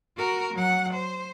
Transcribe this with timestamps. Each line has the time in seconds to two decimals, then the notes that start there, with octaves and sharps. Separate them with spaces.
0.17 F#4 A#4
0.54 F#3 F#5
0.93 C5